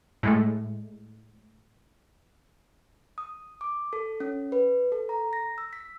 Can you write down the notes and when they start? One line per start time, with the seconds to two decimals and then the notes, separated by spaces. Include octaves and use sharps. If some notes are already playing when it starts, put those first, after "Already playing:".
0.23 A2 G#3 A3
3.18 D#6
3.61 D6
3.93 A4
4.20 C#4
4.52 B4
4.92 A4
5.09 A#5
5.33 A#6
5.58 E6
5.73 B6